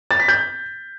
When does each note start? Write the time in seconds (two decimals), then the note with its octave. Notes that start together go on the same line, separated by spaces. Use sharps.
0.11 A6
0.20 B6
0.28 G6